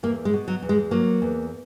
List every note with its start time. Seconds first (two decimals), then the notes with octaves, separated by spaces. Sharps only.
0.03 E2 A#3
0.25 G#3
0.33 B2
0.48 F#3
0.62 E2
0.69 G#3
0.91 F#3 A#3
1.22 E2